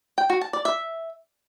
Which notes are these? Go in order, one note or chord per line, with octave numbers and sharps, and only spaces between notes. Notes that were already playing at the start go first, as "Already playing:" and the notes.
G5
F#4
A5
D5
E5